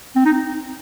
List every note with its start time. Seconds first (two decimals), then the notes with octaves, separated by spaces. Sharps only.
0.16 C4
0.25 D#4